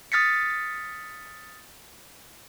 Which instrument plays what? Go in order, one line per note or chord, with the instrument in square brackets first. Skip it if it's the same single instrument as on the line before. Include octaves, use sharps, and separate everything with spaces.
[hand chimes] D#6 F6 A6 B6 C#7